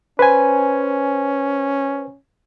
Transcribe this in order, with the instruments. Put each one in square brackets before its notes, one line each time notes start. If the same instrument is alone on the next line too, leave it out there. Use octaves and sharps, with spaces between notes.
[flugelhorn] C#4 [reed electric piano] B4 C5 G#5